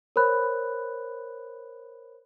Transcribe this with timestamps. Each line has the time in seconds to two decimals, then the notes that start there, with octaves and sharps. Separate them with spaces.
0.16 A#4 C5 C#5 B5 F#6